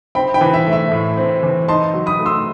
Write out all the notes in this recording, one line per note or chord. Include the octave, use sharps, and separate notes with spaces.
C4 G5 B5
G5 B5
E3
E5
A3
E5
A2
C4
E3
D#4 A5 C6
F#3
B5 D#6
A3
C6 E6